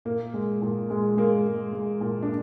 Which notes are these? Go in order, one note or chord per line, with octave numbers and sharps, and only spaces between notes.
A#2 A#3
G#3
A#2
G#3
G#3 A#3
G#3
G#3
A#2
D4